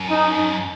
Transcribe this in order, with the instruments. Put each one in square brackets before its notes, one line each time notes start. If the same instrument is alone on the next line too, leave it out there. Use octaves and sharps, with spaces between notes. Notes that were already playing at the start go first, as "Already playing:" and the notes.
Already playing: [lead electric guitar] F#2
[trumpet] D#4